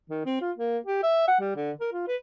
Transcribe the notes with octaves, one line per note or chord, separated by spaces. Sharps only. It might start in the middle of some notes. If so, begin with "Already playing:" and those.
D#3
C4
F4
A#3
G4
E5
F#5
G3
D3
A#4
F4
B4